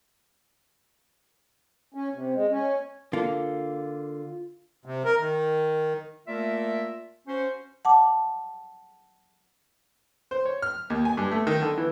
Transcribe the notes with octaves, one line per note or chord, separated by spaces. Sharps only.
C#4
C3
G#3
C#4
D3 A#3 F4
C3
A#4
D#3
A3 A#3 F4 A#4 D5 E5
C#4 F#4 C5
F#5 A5 D6
C5
C#5
F6
D#2
G#5
G2
A3
D#3
D3
E3